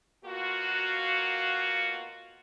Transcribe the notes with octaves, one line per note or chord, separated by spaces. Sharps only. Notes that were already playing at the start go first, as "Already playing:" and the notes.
B2 A#3 F4 F#4